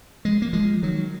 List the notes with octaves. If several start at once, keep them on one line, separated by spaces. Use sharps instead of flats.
F3 G#3
A#3
F3 G#3
D#3 F#3